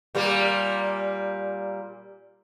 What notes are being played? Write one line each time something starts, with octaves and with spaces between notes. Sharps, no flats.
A#2 G3 A#3